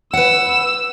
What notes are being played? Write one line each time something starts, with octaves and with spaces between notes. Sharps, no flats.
B4 F#5 E6